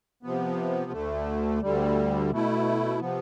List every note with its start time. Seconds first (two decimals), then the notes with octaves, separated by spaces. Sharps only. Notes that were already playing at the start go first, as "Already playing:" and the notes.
0.23 C3 F3 B3
0.92 D2 D3 A3
1.62 D2 D3 G3
2.30 B2 A3 E4
2.99 C3 F3 B3